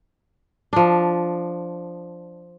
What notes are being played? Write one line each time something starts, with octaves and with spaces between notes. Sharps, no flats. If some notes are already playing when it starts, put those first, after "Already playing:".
F3 D4